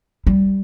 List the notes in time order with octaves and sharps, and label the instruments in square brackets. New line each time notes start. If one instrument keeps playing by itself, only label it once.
[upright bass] G3